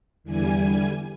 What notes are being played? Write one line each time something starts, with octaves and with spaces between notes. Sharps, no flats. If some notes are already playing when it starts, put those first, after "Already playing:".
E2 D3 E3 G3 G#5